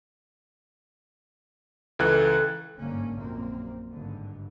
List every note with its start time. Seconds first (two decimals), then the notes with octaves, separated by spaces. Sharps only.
1.99 C#2 E3 A4 F#6
2.78 G1 G#2 D3 A#3 C#4
3.14 A#1 F#2 A#3 C4
3.92 G#1 G2 D3